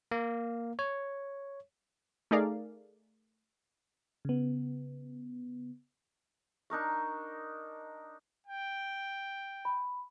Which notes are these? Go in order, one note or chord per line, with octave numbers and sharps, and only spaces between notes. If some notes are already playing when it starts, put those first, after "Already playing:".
A#3
C#5
A3 D#4 G#4 A#4 D5 F5
C#3 B3
D4 D#4 A#4 C#6
G5
B5